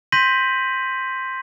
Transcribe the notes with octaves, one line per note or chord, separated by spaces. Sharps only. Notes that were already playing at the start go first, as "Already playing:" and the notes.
C6 G6 A#6 B6 D#7 F#7